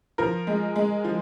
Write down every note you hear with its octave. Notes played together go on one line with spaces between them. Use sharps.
F3 A#4
G#3
G#3
F3